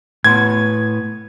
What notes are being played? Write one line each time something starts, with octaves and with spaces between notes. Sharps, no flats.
A2 B3 C6 G#6